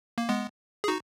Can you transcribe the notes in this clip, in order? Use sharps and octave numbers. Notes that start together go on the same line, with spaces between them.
A#3
G#3 B3
G#4
D#4 F#4